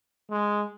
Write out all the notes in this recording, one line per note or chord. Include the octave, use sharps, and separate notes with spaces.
G#3